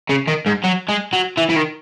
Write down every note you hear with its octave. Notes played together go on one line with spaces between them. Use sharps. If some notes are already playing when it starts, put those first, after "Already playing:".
C#3
D#3
G#2
F#3
G#3
F#3
E3
E3
D#3